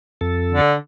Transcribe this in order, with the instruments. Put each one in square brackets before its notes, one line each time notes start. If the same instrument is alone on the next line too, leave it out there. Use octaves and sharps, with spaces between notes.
[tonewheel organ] F2 A4
[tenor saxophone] D3